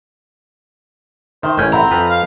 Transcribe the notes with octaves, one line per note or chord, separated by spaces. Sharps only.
D#3 C5 E5
A1 C#4 A#4 G6
C4 E5 F#5 A#5 B5
F2 F3 B4
F5